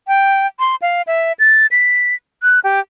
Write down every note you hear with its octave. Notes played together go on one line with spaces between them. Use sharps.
G5
C6
F5
E5
A6
B6
F#6
G4